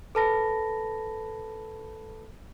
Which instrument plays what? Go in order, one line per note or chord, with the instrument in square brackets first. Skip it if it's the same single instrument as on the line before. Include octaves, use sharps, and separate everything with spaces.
[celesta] A4 B4 A5 B5 A#6